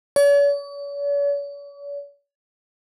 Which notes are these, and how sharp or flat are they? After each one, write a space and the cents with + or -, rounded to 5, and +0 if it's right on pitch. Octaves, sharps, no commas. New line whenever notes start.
C#5 +45